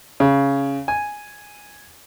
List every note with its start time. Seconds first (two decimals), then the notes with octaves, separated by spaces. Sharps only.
0.20 C#3
0.88 G#5